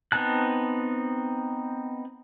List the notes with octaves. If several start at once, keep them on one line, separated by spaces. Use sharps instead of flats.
B3 C4 D#4 A5 F#6